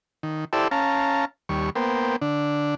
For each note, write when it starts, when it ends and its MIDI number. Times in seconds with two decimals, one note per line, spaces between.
0.23 0.45 51
0.53 0.68 64
0.53 0.68 67
0.53 0.68 69
0.53 0.68 72
0.53 0.68 74
0.53 0.68 88
0.71 1.25 61
0.71 1.25 77
0.71 1.25 81
0.71 1.25 82
1.49 1.70 39
1.49 1.70 55
1.49 1.70 85
1.76 2.16 58
1.76 2.16 59
1.76 2.16 72
1.76 2.16 79
2.22 2.75 50
2.22 2.75 62